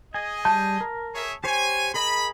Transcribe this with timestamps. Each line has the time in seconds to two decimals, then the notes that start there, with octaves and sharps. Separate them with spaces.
0.14 G#4 D#5 G#5
0.45 G3 A5 G6
0.81 A#4
1.14 G#4 C#5 E5
1.44 G4 C5 C#5 G#5
1.94 G#4 A#4 D#5 B5